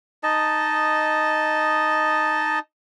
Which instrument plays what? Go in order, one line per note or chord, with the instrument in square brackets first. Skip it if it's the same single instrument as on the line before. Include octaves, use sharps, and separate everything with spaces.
[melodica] D#4 D#5 A5